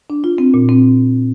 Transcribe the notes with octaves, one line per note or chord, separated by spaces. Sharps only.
D4
F4
C4
A#2
C4